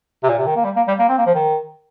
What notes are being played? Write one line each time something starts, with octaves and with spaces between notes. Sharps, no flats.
C3
A#2
C3
D#3
A#3
G3
A#3
G3
A#3
C4
A#3
F3
D#3